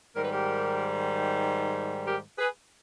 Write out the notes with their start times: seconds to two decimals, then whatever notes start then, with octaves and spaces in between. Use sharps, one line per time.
0.15 G#2 D#3 G3 A#4
0.23 B4
0.31 G4 A#4
2.05 G4 A#4
2.37 G#4 B4